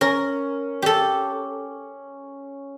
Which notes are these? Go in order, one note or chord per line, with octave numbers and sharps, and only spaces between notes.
C#4 A#4
G4 A4